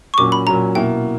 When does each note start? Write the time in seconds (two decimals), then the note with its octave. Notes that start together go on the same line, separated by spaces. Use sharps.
0.14 C#6
0.18 A#2 F#3 C#4 D6
0.32 B5
0.47 A#2 F#3 C#4 A#5
0.75 B2 A#3 E4 G5